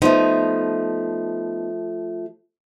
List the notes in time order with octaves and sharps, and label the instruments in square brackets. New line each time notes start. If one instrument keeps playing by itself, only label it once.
[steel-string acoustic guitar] F3 A3 [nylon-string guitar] B3 D#4